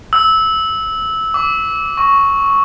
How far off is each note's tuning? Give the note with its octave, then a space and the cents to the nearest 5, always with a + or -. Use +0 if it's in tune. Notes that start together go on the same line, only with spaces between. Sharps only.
E6 -15
D6 -25
C#6 +0